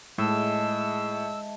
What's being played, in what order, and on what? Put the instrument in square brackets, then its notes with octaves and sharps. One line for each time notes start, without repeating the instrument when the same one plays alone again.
[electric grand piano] A2 [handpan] G#3 [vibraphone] E5 A5 [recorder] E6